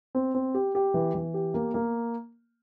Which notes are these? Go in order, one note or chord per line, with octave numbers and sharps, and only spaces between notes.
C4
C4
G4
G4
E3
E3
G4
A#3
A#3